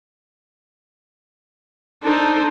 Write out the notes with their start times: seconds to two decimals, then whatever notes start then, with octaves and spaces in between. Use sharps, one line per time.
2.03 D4 D#4 A4 C5